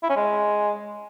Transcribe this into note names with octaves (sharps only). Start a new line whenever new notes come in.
E4
C#4
G#3